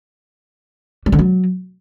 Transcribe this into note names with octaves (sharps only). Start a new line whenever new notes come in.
G3
D3
F#3